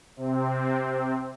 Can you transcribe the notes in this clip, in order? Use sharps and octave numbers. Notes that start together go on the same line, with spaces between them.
C3 C4